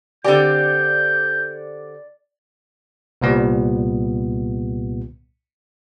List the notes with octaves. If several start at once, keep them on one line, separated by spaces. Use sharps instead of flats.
D3 C4 G4 D5 G6
C2 A#2 G3 B3